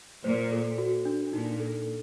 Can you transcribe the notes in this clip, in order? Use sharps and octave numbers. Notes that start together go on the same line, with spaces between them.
A#2 C5
A4
F#4
D4
A#2 D#4
A4